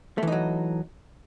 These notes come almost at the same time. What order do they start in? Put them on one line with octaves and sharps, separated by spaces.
A3 E3 D#4 F#3